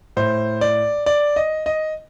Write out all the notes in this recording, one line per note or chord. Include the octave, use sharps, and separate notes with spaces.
A2 C5
D5
D5
D#5
D#5